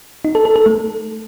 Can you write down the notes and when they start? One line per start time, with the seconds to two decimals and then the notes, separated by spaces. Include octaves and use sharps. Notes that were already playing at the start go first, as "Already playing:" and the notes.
0.25 D#4
0.35 A4
0.45 A4
0.56 A4
0.66 A3